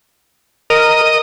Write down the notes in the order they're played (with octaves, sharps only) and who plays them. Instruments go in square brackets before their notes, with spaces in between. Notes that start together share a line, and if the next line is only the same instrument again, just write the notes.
[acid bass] A#4 [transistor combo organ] D#5